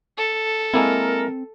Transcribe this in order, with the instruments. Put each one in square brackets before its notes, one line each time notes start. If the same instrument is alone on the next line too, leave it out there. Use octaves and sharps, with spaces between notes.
[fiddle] A4
[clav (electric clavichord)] G#3 A#3 E4 [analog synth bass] C4 [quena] A#4